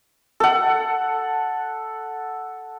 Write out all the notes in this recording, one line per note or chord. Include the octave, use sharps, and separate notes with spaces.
A4 F#5